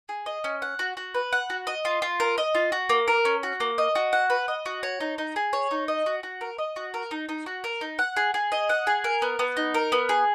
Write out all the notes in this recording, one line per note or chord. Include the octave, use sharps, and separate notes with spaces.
G#4
D#5
C#4
F#5
F#4
F#4
B4
F#5
F#4
D#5
F4
F4
A#4
D#5
F4
F#4
A#3
A#4
C#4
F#4
A#3
D#5
F#4
F#5
B4
D#5
F#4
C#5
D#4
D#4
G#4
C#5
D#4
D#5
F#4
F#4
A#4
D#5
F#4
A#4
D#4
D#4
F#4
A#4
D#4
F#5
G#4
G#4
D#5
F#5
G#4
A#4
B3
B3
D#4
A#4
B3
G#4